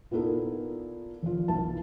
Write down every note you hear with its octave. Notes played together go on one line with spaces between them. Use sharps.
A#2 B3 D#4 E4 A4 A#4
F1 F4
B1 E3 A5